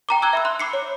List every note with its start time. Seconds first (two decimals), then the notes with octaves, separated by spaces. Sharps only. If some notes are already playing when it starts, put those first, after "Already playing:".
0.09 G5 A#5 D6
0.22 A5 D6 E6 F#6 G#6 G7
0.33 E5 B5 E6
0.45 C6 F#6
0.59 B5 D6 C7 C#7
0.73 C#5